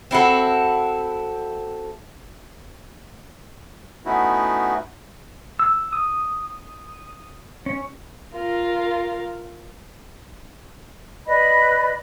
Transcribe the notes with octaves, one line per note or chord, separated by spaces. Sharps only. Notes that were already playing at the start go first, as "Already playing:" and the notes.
C4 E4 F#4 A4
A3 B3 C#4 D#4 E4 F#4
E6
D#6
C#4
F4 A#4
B4 D5 D#5 B5